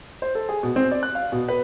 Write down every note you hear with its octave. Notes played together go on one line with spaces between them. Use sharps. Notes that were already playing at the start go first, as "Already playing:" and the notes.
C5
A4
G#4
B2
C4
D5
F#6
F5
B2
B4